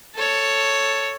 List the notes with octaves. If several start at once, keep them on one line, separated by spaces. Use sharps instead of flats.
A4 C#5